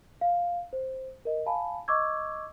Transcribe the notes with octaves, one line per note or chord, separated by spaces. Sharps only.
F5
C5
A#4 D#5
F5 G#5 A5 B5
D#5 C#6 D6 E6 G#6